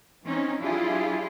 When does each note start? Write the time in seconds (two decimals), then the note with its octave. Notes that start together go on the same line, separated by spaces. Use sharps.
0.25 E3 C4 C#4 D#4
0.60 F#3 D4 E4 F4 G4 G#4